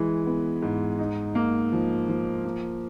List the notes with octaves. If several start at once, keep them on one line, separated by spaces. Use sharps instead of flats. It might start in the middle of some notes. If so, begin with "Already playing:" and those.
Already playing: E3 G#3
B3
G#2
D#4
A#3
F3
F3
A#3